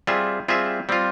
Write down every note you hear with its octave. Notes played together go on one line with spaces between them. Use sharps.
G3 C4 F4 G#4 E5
G3 C4 F4 G#4 E5
G3 C4 F4